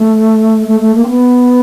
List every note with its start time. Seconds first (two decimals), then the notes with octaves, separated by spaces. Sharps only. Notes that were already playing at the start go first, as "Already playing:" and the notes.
Already playing: A3
0.67 A3
0.80 A3
0.95 A#3
1.03 C4
1.09 B3